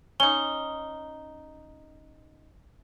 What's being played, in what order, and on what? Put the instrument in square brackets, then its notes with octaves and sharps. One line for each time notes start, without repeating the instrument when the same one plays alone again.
[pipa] C#4 D#4 [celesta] G7